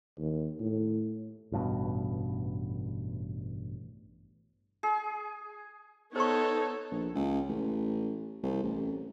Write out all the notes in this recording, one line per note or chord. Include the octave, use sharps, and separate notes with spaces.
D#2
A2
A1 G2 B2
G#4
B3 D#4 A4 C5 C#5 C#6
A#1
C#2
A1
C2
A1